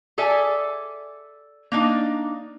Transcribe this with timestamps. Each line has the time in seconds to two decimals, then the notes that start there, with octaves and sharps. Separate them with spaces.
0.18 G#4 A4 D5 E5 G#5
1.72 A#3 D4 D#4